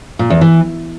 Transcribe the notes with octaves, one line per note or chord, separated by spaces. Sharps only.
A#2
E2
E3